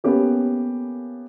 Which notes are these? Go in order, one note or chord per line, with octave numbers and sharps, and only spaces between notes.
A#3 B3 C#4 G4 A4